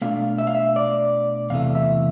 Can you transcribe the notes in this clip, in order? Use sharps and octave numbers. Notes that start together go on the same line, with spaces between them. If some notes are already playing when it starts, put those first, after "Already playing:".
B2 A3 D4 F4 F5
E5
F5
E5
D5
E2 C3 E3 A3 F5
E5